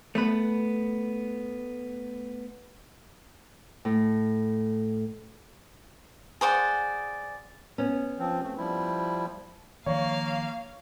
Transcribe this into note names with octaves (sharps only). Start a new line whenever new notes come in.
A3 B3 B4
A2
G#4 C5 D5 F#5
B3 C#4
F3 C4
A3 C4
F3 G3 E4
D#3 F3 A#3 C#5 F5